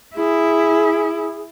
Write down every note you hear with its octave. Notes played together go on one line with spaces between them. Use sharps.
E4 G#4